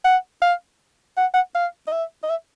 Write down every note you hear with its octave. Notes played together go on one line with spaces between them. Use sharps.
F#5
F5
F#5
F#5
F5
D#5
E5
D#5
E5